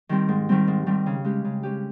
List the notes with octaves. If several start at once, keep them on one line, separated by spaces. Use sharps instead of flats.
D#3 G3 C4
G#2
D#3 G3 C4
G#2
D#3 G3 C4
C#3
G#3 C#4 G4
C#3
G#3 C#4 G4